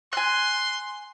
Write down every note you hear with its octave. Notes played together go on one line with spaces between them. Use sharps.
G#5 C6 F#6